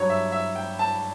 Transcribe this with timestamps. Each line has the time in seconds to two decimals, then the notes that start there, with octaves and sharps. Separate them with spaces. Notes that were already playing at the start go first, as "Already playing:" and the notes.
Already playing: G2 F#3 C#5
0.10 E5
0.32 E5
0.56 G5
0.79 A5